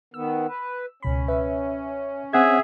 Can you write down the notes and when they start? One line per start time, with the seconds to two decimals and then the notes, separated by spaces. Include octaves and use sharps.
0.14 D#3 B3 E6
0.47 B4
1.03 C#2 B2 C#4 B5
1.28 B4 E5
2.33 C4 G#4 E5 F#5 G#6